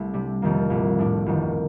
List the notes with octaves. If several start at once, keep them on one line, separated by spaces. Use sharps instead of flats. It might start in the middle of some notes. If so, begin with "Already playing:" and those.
Already playing: C2 A3
C3 G3 D4
F1 F2 C3 D#3 A#3
C2 A#2 A3
A2 A3 D4
G1 F2 D#3